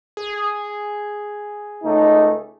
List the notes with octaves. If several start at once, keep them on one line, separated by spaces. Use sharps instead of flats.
G#4
C#2 A3 D#4